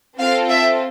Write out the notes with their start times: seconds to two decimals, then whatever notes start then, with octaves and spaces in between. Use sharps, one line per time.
0.19 C4 F4 A4 F5
0.49 E5